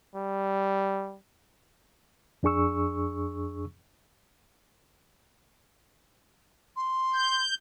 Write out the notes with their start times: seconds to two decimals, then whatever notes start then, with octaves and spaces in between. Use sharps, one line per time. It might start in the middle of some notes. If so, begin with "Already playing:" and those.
0.16 G3
2.43 F2 D4 G#4 C#6 E6
6.76 C6
7.14 G6